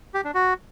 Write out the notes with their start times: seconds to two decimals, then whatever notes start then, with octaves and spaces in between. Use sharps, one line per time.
0.14 G4
0.24 D4
0.34 F#4